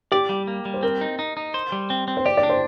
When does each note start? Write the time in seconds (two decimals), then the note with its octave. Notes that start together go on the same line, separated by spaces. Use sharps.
0.12 G4 D5
0.29 G3
0.48 A#3
0.65 G3
0.74 C5
0.83 C4 A#4
1.01 D#4
1.19 D#4
1.37 D#4
1.54 C5
1.72 G3
1.90 C4
2.08 C4
2.17 C5
2.25 G4 D5
2.37 D5
2.43 D4
2.50 C5